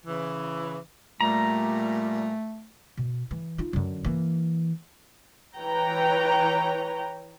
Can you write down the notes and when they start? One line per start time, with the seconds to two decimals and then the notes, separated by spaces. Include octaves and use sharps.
0.06 C#3 E3
1.21 A#2 G3 A3 A#5
2.97 B2
3.31 E3
3.58 D#4 F4
3.73 F#2 D3
4.05 E3 A#3
5.56 E3 B4 C#5 G5 A#5